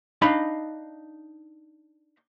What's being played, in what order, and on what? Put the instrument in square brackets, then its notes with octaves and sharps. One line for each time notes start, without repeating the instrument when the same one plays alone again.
[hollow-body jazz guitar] D4 D#4 D#5 F5 B5